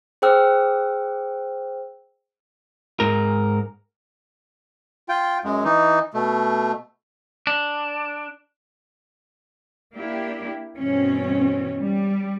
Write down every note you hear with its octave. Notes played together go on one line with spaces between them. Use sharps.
G#4 C5 G5 E6 F6
G#2 A#4
F4 G5
F#2 G#3
E3 D#4
B2 A3
D4
A#3 D4 E4 G4
G2 B2 E3 C4 C#4
G3